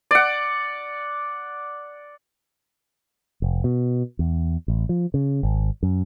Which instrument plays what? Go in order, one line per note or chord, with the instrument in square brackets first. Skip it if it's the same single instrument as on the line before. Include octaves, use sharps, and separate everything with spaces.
[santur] D5 F#5
[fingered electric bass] F1
B2
E2
A1
F3
C#3
G#1
F#2